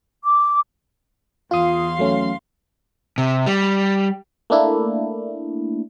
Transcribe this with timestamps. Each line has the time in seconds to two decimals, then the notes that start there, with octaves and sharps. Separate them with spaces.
0.24 D6
1.51 E2 F4 F5 C6 D#6
1.99 F#3 A3 C#4
3.18 C3
3.46 G3
4.50 A3 A#3 D4 E4